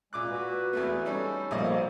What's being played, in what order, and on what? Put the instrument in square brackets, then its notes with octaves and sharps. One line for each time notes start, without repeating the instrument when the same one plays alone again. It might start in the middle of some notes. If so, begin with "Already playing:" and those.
[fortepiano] A#2 D6 F#6 [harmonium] G#3
[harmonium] F#4 B4
[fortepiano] E2 A3 B3
[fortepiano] G3 C#4 D#4 [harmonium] A4
[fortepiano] A#1 G2 D#5 [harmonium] B2 F3 A#3